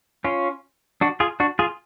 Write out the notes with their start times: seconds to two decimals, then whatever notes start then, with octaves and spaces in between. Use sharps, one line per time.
0.24 C#4 F4
1.01 D4 F#4
1.20 F4 G#4
1.40 D4 F#4
1.59 F4 G#4